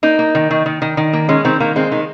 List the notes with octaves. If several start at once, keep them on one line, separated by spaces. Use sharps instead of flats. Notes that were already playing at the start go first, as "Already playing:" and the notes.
A#3 D#4
A#3
D#3
D#3
D#3
D#3
D#3
A#3
G#3 C#4
D#3 C4
D#3 A#3
G#3 C4
D#3